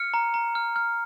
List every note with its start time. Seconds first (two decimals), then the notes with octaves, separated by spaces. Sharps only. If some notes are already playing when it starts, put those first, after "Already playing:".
Already playing: F6 C#7
0.14 A#5
0.34 A#5
0.55 F6
0.76 F6